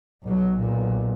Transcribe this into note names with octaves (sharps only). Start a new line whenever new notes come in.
B1 F#3
B1 A#2